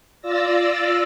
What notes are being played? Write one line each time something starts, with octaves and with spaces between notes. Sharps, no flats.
F4 D5 E6 A6 A#6